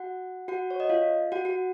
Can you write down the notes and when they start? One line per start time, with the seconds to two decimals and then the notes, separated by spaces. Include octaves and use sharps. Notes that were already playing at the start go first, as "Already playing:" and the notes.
Already playing: F#4 F#5
0.48 F#4 F#5
0.71 C#5
0.80 D#5
0.90 F4 F5
1.32 F#4 F#5
1.45 F#4 F#5